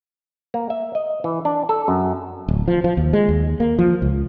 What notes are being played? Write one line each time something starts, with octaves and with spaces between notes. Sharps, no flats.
A#3
E5
D#5
E3
D4
A4
F#2
D1
F3
F3
D#2
G#3
D#2
A#3
F3
C#2